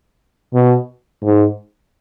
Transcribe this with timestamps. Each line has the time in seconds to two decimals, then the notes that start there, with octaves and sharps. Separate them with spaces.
0.54 B2
1.23 G#2